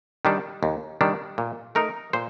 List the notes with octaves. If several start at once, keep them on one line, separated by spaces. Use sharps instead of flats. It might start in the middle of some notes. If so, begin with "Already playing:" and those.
D#3 G3 D4
D#2
D#3 G3 D4
A#2
A3 D#4 A#4
A#2 C5